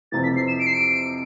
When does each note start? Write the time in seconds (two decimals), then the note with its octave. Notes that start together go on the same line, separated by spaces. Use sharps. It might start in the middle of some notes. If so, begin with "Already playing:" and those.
0.12 F2 C3 E3 A6
0.23 B6
0.36 C7
0.48 E7
0.59 D7
0.67 C7
0.74 D7